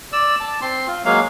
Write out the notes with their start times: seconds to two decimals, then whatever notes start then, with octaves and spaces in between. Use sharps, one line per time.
0.12 D5 E6
0.40 A5
0.61 C4 C6
0.87 F4
1.05 F#3 G#3 A#3 F5